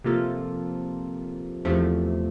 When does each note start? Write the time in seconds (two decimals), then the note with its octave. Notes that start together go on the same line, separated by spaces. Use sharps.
0.04 C3 F3 A#3 F4 A4
1.65 E2 C3 F3 A3